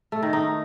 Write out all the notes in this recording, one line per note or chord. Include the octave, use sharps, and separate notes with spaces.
A3
D#3
D#4